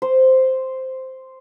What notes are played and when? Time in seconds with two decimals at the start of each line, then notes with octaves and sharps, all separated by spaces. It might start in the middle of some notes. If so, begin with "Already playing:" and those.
0.02 C5